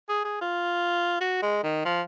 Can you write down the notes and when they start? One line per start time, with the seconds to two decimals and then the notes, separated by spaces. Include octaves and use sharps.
0.09 G#4
0.25 G#4
0.41 F4
1.21 F#4
1.42 G#3
1.63 D#3
1.85 F3